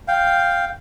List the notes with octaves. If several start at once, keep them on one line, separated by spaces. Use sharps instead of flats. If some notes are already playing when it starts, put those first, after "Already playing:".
F5 G5